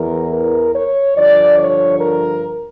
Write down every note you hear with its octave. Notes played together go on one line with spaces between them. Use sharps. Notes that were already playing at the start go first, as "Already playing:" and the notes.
Already playing: E2 E3 A#4
A#4
C#5
G2 D3 F3 D5
C#5
A#4